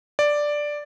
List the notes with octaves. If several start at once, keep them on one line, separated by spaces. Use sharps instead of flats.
D5